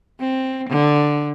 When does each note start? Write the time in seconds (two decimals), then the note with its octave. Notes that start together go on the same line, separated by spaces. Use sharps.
0.20 C4
0.69 D3